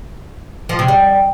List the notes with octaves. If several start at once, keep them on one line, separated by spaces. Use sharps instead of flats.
F3
C3
G3